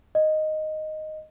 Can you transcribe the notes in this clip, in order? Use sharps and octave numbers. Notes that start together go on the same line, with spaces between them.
D#5